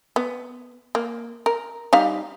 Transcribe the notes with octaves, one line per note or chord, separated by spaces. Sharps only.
B3
A#3
A#4
G3 D#4 F5